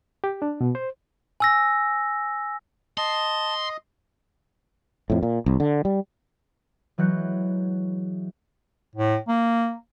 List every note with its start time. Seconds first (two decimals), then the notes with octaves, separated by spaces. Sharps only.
0.24 G4
0.42 D4
0.61 B2
0.75 C5
1.40 G#5 E6 A#6
2.98 D#5 A5 C6
5.10 F2 A2
5.23 A#2
5.46 C2
5.60 D3
5.85 G3
6.98 E3 F#3 G#3 F#6 G6 C#7
8.96 A2
9.28 A#3